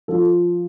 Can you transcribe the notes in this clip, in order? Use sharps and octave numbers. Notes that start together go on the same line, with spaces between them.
F3 A4